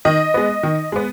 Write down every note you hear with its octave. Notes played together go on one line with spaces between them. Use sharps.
D#3 D#5
G#3 B3
D#3
G#3 B3